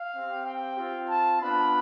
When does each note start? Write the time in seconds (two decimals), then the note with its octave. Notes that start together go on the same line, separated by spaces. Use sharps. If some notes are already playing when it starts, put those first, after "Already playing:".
Already playing: F5
0.15 C4 G4
0.46 G5
0.77 C4 F4
1.08 A5
1.40 B3 D4 F4 B5